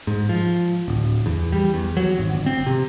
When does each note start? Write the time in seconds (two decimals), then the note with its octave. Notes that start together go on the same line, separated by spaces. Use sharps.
0.07 G#2
0.29 F3
0.88 D1
1.26 E2
1.53 G3
1.74 E2
1.97 F#3
2.18 G#1
2.33 G1
2.46 C4
2.66 C3